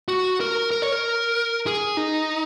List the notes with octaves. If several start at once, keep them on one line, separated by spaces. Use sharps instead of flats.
F#4
A#4
A#4
C#5
A#4
G#4
D#4